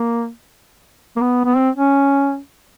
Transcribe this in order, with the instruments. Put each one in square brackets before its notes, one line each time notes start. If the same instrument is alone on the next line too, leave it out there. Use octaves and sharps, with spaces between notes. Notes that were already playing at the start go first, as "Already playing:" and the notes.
Already playing: [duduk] A#3
A#3
B3
B3
C4
C#4